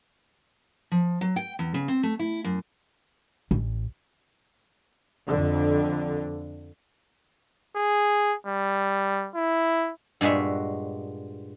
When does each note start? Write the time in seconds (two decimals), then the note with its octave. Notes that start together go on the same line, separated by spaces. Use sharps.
0.92 F3
1.21 F#3
1.36 G5
1.59 E2
1.74 C#3
1.88 C4
2.03 A3
2.19 E4
2.44 F#2
3.51 A1
5.28 F2 D3
7.76 G#4
8.47 G3
9.35 E4
10.21 G2 A#2 G#3 F#4 E5